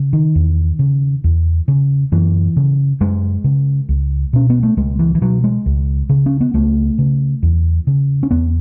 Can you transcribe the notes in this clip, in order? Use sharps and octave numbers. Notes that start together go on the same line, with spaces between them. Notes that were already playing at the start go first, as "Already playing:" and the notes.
Already playing: C#3
D#3
E2
C#3
E2
C#3
F#2 E3
C#3
F#2 G#3
C#3
C#2
B2 C#4
B3
A3
C#2 G#3
E3
E3
B2 F#3
G#3
C#2
C#3
C#4
B3
C#2 A3
C#3
E2
C#3
C#4
E2 B3